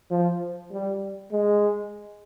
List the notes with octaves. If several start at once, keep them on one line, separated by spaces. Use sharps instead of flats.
F3
G3
G#3